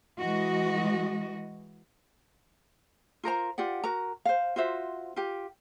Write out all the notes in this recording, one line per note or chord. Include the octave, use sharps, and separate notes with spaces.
E3 G#3 F#4 D#5
F4 A#4 C5 A#5
F4 G4 D5 F#5
F#4 A#4 A#5
C5 F5
F4 F#4 C5 E5
F4 G4